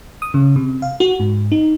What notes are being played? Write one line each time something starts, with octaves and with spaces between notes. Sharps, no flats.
D#6
C#3
C3
F5
F#4
G#2
D#4